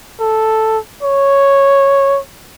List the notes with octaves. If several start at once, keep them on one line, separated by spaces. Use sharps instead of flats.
A4
C#5